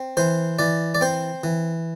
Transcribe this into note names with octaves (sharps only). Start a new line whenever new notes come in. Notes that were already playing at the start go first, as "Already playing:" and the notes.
Already playing: C4
E3 C5
E3 D5
D5
C4 C5
E3